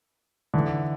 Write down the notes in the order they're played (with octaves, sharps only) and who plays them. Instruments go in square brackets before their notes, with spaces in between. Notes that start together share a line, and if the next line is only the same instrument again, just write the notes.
[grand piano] D3 E3